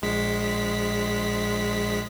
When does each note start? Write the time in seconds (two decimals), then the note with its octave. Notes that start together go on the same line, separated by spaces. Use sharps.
0.02 A#1 G#3 B6